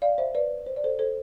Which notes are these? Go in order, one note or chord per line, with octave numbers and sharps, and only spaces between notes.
D5 F5
C5 E5
B4 D5
C5
D5
A4 C5
A4 C5